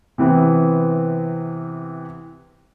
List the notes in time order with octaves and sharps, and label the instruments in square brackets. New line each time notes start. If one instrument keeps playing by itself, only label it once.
[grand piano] C3 E3 B3 C4